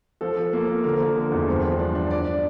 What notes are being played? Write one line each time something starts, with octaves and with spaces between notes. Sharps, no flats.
F3 A4
F3
A#3
A#3
D3 A#4
F3
D3
E2
G2 C5
F3
D4
D4
D4 D5
D4